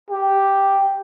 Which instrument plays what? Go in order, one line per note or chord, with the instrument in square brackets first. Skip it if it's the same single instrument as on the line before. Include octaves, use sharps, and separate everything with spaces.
[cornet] G4